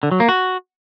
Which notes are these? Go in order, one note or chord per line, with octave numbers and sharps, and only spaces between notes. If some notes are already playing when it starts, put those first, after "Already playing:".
D3
F#3
A#3
F#4